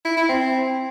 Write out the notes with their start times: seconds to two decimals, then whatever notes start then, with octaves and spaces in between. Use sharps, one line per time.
0.05 E4
0.17 E4
0.29 C4